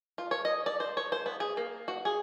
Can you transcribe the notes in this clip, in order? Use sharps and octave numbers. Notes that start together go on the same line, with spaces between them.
F4
C#5
D#5
D5
C5
C#5
C5
B3
G#4
A#3
F#4
G#4